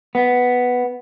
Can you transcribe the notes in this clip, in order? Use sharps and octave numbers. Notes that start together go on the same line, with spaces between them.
B3